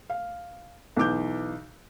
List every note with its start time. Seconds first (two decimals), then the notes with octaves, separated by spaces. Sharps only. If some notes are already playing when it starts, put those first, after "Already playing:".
0.10 F5
0.97 B1 E3 D6 G6